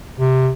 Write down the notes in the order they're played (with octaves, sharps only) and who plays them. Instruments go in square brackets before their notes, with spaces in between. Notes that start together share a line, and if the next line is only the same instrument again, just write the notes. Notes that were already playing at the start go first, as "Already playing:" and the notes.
[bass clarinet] C3